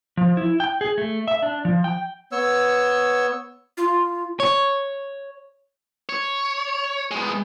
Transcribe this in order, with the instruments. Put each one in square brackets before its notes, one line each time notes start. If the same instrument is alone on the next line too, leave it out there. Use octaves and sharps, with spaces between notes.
[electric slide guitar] F3
E4
G5
G#4
A3
E5
D4
F3
G5
[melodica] B3 C#5 E6
[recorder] F4
[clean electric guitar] C#5
[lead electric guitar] C#5
G#3 B3